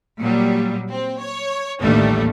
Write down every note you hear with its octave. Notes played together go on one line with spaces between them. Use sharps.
A#2 F#3 G3
C4
C#5
A1 D#2 G3 A3 D4